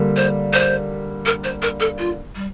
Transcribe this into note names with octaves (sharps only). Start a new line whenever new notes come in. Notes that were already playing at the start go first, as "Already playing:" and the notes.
Already playing: D3 G3 A#3
C5
C5
A#4
C5
A#4
A4
F4
G3